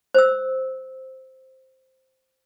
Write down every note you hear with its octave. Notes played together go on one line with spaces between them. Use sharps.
C5 E6